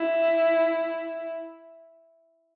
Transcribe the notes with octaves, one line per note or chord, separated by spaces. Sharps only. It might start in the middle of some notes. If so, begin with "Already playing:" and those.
Already playing: E4